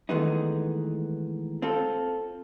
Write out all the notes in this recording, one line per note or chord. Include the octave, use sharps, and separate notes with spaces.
D#3 E3 G#3 A3 B3 D#4
C4 F4 A4